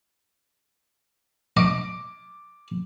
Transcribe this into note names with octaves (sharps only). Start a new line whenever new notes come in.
D#5 D6 D7